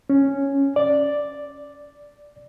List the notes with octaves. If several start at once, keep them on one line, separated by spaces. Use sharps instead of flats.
C#4
D5